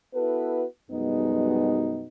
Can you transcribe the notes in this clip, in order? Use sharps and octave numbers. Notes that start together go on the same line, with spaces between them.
B3 E4 F#4 A4 B4
F#2 B2 G3 G#3 B3 D#4